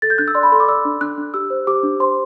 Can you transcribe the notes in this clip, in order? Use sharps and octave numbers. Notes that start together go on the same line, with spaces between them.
A4 A6
G6
D4 F#6
E6
D5 C6
B5
A4 C6
D6
D5 E6
D4
D4 F#6
D4
G4 E6
C5
G4 D6
D4
C5 C6